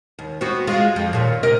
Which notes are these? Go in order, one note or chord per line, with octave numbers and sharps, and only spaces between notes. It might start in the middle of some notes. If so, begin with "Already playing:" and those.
D#2
B3 C4 F#4
G#3 F4
F2
D#2 A#2
C3 A#4 D#5